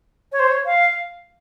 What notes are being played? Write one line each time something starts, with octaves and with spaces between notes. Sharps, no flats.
C#5
C5
C#5
F5